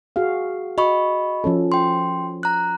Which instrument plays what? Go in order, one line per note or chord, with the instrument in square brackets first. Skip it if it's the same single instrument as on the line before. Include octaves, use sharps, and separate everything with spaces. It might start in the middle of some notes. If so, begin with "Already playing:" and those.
[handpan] F#4 G#4 F5
[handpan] F#4 [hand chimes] D#5 B5 C#6
[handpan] F3 C#4 A4
[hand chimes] G5 C6
A#5 F#6